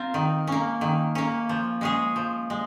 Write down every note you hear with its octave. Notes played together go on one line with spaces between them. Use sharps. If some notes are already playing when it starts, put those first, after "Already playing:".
Already playing: C4 F4 A#4
D#3
A#3 C#4
D#3
A#3 C#4
F3
G#3 C#4 G#4
F3
G#3